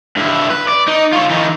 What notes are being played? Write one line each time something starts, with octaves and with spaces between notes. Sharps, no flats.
G2 E4
B4
D5
D#4
F4 C#5
E3 D#4